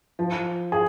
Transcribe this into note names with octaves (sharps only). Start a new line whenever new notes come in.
F3
G#4